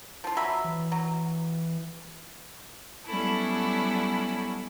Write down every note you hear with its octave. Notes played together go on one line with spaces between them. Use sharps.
F3 F4
F#3 E5 B5
E3
F#3
F#3 G3 B3 C#4 E4 A4